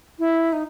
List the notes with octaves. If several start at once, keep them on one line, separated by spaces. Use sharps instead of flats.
E4
D#4